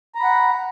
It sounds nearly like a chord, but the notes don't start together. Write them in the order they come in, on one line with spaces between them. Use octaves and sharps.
A#5 B5 F#5